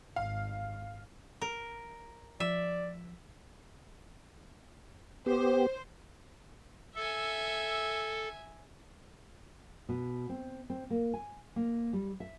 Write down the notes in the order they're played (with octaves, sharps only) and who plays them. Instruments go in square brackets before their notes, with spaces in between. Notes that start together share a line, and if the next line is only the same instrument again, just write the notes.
[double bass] G#1 [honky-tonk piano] F5
[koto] A#4
[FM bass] F3 [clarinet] D5 [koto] E5
[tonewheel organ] B3 G4 [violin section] C5
[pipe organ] A4 [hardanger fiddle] E5 G#5
[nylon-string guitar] B2
C4
C4
A#3
G#5
A#3
G3
E5